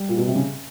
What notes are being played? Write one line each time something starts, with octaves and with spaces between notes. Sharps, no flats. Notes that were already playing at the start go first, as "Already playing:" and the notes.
Already playing: G3
A#2
B2
C3
C#3